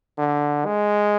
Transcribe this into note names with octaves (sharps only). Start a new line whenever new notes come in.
D3
G#3